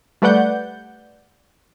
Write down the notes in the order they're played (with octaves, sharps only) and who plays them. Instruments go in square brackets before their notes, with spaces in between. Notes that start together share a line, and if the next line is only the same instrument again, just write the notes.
[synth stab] G3 A3 B4 D5 F#5 G6